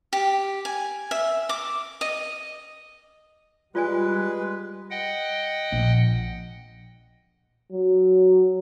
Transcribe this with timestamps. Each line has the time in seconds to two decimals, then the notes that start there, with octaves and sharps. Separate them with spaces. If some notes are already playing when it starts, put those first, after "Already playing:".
0.13 G4
0.65 G#5
1.11 E5
1.49 D6
2.01 D#5
3.75 G3 G#3 F4 B4 D5 G#5
4.90 D#5 F#5 G5
5.73 A#1
7.73 F#3